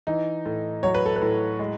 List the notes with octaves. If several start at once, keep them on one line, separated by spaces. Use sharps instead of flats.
E3 D#4
A2
F#3 C#5
B4
A4
B4
A2
G#3